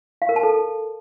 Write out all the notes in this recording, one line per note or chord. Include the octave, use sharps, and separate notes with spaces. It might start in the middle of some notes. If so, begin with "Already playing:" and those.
F5
A#4
A5
A4